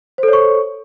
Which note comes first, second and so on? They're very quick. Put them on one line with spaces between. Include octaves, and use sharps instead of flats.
C5 A4 C#5 C#6